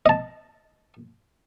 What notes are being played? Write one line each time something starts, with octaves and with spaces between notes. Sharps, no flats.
D#5 A5